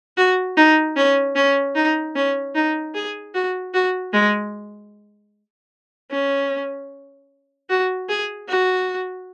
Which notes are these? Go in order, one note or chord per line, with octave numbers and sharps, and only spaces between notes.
F#4
D#4
C#4
C#4
D#4
C#4
D#4
G#4
F#4
F#4
G#3
C#4
F#4
G#4
F#4